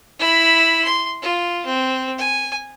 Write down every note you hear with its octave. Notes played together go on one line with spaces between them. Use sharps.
E4 B5
C6
F4
C4
G#5